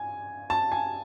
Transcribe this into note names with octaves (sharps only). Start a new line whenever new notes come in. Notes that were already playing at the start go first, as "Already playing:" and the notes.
Already playing: G#5
A5
G#5